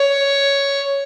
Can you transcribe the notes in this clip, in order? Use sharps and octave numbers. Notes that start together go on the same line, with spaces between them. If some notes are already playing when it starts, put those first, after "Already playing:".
Already playing: C#5